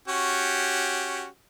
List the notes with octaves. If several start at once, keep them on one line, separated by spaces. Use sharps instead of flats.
C#4 F#4 G4